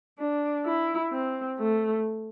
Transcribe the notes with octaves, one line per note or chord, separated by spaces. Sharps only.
D4
E4
C4
A3